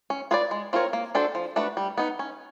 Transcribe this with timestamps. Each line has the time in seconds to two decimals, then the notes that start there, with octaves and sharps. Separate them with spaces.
0.10 C#4
0.31 F4 G#4 B4 D5
0.51 G#3
0.73 C4 F4 A#4 C#5
0.93 A#3
1.15 D4 F#4 A4 C5
1.35 F3
1.56 A3 D4 F#4 B4
1.77 G3
1.98 B3 D#4
2.19 C#4